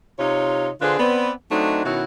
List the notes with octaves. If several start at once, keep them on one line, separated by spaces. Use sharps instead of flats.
C3 D#4 F4 C#5
D3 D4 F4 G#4 B4 C5
B3 C4 D5
F#3 A3 C4 D4 D#4
B2 D#3 C#4 E4 F#4